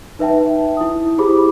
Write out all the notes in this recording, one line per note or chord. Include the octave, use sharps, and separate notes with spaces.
D#4 B4 E5 G5 A5
E4 D#6
E4 G4 G#4 C5 B5 D6